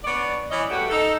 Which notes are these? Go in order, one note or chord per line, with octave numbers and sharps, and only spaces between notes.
B3 D4 C#5 D5
E3 C#4 D5 D#5
G3 A3 B3 F#4 G4
D#4 A4